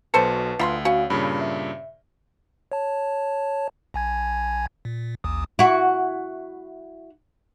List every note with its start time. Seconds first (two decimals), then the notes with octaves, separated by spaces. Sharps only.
0.14 B1 B2 A4 B4 C5 A5 C#7
0.59 D2 F4 B5 C6
0.85 C#4 F#4 F5
1.10 G2 A#2 C#3 B5
1.41 E5
2.72 C#5 A5
3.94 A#1 G#5 G#6
4.85 A#2
5.24 A1 D#2 D#6
5.59 E4 F#4